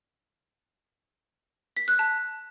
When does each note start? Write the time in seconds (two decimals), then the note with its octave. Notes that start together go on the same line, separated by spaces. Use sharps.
1.77 B6
1.88 F#6
1.99 A5